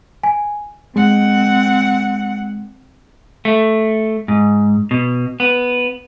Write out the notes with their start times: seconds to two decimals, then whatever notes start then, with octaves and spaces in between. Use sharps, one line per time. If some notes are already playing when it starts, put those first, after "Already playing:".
0.23 G#5
0.96 G#3 C4 F#5
3.45 A3
4.28 G#2
4.91 B2
5.40 B3